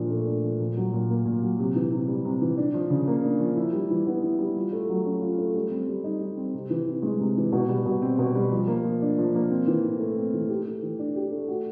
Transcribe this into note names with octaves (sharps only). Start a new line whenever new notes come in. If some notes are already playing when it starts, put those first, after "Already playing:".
Already playing: A#2 F3 D4
A3
D4
F3
A#2
F#3
A#2
A#3
A#2
F#3
C3
E3
C3
G3
C3
E3
D4
F3
C#3
A#3
D4
F3
E4
G3
E3
B3
E4
G3
F4
A3
F#3
C#4
F4
A3
G3
C4
G3
D#4
G3
C4
C3
E3
C3
G#3
C3
E3
B2
G3
B2
C4
B2
G3
F3
A#3
F3
D4
F3
A#3
C4
E3
A2
A3
C4
E3
G4
A3
E3
D4
G4
A3
F#4